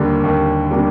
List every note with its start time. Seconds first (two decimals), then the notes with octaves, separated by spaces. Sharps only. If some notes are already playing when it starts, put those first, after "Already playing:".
Already playing: D#2 D3 G3 A#3 D4
0.24 D#2
0.71 D3 G3 A#3 D4